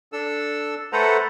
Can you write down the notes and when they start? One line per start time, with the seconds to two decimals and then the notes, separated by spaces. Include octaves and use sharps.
0.13 D4 A4 E6
0.93 A3 A4 B4 C5 F#5 A#5